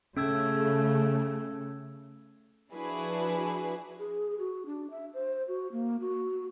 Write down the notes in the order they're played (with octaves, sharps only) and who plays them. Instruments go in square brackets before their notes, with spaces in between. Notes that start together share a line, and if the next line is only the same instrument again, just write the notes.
[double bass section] C#3 A3 [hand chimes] C#4 E6 G#6
[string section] F3 D4 E4 F#4 G#4 B4
[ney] G#4
F#4
D4
E5
C5
F#4
A#3
F#4